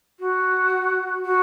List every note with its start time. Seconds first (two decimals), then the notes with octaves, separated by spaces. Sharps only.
0.20 F#4
1.25 F#4